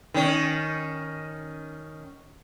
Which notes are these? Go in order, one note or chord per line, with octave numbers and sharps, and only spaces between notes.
D#3 C#4